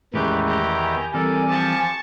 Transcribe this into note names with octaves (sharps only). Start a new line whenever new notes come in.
E2 A2 D#3 E3 G#3 C#4 G4 B4
G4 A#5
G#5
E3 G3 C4 A4 A#4 D5 G#5
F3 G4 A5 C#6